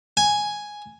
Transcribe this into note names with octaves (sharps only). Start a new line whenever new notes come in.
G#5